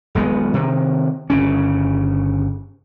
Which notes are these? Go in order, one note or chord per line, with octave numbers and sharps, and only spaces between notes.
D#1 B1 G#3 B3
C3 D#3
G1 C#3 C#4